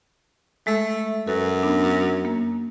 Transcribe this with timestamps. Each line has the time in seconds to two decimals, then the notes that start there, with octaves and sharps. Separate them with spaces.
0.67 G#3 A3
1.27 F#2 F#4 A4 B4
1.63 B3 D4
2.25 A#3